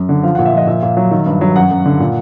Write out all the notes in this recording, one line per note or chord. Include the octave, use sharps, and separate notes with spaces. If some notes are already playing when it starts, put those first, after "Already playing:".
Already playing: F#2
D3
F3 F5
A#2 F#5
E5
F3 D#5
A#2 E5
A#2
F#3
D#3
G2
F#3
F#2 F#5
F#2
D3
A#2